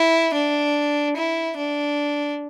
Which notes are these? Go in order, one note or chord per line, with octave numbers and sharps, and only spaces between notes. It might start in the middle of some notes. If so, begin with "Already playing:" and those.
Already playing: E4
D4
E4
D4